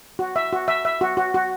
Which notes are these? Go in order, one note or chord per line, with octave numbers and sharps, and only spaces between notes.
F#4
E5
F#4
E5
E5
F#4
F#4
F#4